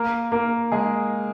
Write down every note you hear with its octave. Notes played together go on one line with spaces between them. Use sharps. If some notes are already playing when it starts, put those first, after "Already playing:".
Already playing: A#3 A#4
A#3 A#4
G#3 G#4